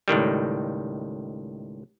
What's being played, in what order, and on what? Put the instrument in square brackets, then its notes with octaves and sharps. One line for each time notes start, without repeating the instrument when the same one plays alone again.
[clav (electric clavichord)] C#2 A2 D#3 G3